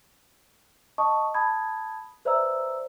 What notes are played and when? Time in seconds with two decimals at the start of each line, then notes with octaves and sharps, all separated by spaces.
0.98 D#5 A5 C#6 D#6
1.34 A5 B5 D#6 G#6
2.25 B4 C5 D5 E5 A#5 E6